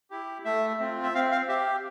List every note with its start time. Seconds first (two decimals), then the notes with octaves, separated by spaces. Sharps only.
0.10 E4 G4
0.45 A3 E5
0.80 C4 F4
1.03 E5
1.14 C4 F5
1.32 F5
1.49 G4 E5